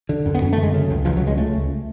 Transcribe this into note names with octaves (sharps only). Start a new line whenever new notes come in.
D3
F#2
B3
F#2 C#4
A3
D3
G#3
C#3
C#2
C#2 F3
F#3
C#3
G#3
C#3 A3
C#2